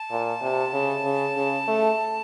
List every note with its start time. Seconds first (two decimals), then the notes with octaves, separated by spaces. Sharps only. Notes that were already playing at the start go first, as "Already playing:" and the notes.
Already playing: A5
0.11 A#2
0.41 C3
0.73 C#3
1.04 C#3
1.37 C#3
1.68 A3